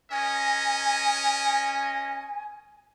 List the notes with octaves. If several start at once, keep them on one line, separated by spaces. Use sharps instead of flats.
C#4 A#4 D#5 G#5